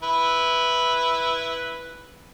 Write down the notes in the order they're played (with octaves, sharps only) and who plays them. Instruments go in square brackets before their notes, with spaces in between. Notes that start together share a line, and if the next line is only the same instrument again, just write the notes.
[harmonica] E4 B4